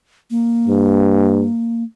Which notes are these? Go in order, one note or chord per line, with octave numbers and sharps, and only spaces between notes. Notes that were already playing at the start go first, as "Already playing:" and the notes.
A#3
G2